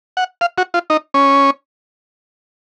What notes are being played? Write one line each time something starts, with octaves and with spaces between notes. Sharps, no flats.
F#5
F5
F#4
F4
D#4
C#4